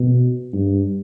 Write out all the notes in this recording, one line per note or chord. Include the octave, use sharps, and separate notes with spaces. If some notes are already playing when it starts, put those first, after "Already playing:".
Already playing: B2
G2